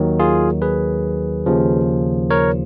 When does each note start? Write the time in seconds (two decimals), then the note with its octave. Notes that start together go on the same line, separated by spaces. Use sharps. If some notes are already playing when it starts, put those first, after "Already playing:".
Already playing: D#2 D#3 F#3
0.19 F4 G#4
0.62 G#4 B4
1.46 D#2 C#3 F3
2.30 A#4 C#5